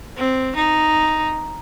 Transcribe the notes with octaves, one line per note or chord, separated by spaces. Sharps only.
C4
D#4